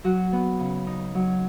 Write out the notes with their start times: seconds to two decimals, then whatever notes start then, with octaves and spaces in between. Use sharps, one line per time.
0.04 F#3 F#4
0.32 B3
0.59 C#3
0.87 D#4
1.15 F#3